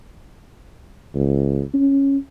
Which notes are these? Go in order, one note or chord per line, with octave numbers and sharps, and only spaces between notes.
C#2
C#4